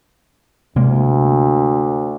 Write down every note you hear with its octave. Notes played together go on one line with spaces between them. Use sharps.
D2 C3 G#3 A#3